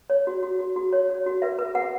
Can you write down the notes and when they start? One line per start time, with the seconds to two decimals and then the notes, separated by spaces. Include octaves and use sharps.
0.10 C#5
0.27 F#4
0.43 F#4
0.59 F#4
0.76 F#4
0.93 C#5
1.10 C#5
1.26 F#4
1.42 B4 E5
1.59 B4
1.75 B4 F#5